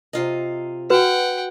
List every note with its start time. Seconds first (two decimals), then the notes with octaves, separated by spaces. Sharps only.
0.13 C3 F4 D#5
0.90 F#4 B4 F#5 G5